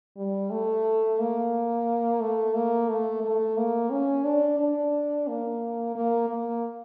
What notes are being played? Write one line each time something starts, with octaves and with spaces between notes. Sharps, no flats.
G3
A3
A#3
A3
A#3
A3
A3
A#3
C#4
D4
D4
A#3
A#3
A#3